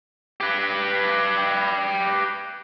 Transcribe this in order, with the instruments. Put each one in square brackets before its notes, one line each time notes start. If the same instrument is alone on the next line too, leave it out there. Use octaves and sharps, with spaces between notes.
[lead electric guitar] G4 B4